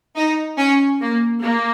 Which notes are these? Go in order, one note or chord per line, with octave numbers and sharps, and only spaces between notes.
D#4
C#4
A#3
A#3